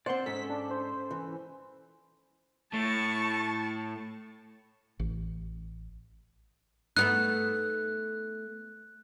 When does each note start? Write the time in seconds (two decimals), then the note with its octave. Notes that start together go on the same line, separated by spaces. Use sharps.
0.06 C4 C5 D5 F#5 C6
0.26 G#2 C#4 A4 B6
0.50 D4
0.71 C5
1.11 E3
2.73 A2 A5 C#6
4.99 A1
6.97 A3 B3 D#4 F#6